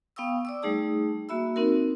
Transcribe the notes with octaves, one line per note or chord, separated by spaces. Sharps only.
B3 F5 G5 C#6 D#6 E6
D5 D6 E6
G3 A3 D#4 G#4 A5 D#6
A#3 F#4 E5 B5 E6
C4 D#4 F#4 A#4